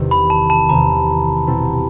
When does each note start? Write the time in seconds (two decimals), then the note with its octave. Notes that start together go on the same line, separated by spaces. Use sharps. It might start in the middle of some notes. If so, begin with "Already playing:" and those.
Already playing: E2 C3 D#3
0.11 B5
0.30 A5
0.50 A5
0.69 E2 C3 D#3 A#5
1.47 B2 G3 C4 E4 A4